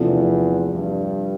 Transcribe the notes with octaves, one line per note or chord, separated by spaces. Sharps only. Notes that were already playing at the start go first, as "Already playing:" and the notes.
Already playing: E2 C3 F3 A3 D4
G2